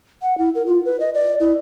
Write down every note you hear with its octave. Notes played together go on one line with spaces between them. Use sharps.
F#5
E4
A#4
F4
B4
D#5
D5
E4